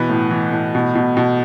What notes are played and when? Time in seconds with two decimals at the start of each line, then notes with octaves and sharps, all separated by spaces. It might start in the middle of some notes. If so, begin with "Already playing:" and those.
Already playing: B2 E3 B4
0.09 A2
0.31 E3
0.52 A2
0.75 B2
0.95 B2
1.17 B2